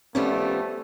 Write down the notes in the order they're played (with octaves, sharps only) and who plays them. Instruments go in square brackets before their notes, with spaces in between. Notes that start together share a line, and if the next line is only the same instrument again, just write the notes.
[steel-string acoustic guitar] F3 G3 B3 [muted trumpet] A3 [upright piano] C#4